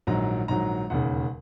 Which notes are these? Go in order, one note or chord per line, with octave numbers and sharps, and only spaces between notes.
A#1 G#2 D#3 F#3 A#5
A#1 G#2 D#3 F#3 A#5
E1 D#2 C#3 F#5